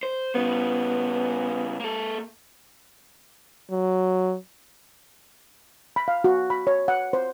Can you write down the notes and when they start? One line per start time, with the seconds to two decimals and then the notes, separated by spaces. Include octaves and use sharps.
0.03 C5
0.35 C#3 G3 B3
1.80 A#3 A4
3.71 F#3
5.96 B5
6.08 F5
6.24 F#4
6.50 B5
6.67 C#5
6.88 F#5
7.13 C5